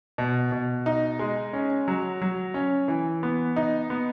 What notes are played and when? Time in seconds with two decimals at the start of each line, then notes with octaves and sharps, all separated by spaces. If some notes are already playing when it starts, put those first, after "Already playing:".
0.18 B2
0.52 B2
0.86 D#4
1.19 G#3
1.53 C#4
1.88 F#3
2.22 F#3
2.54 C#4
2.88 E3
3.23 B3
3.56 D#4
3.90 B3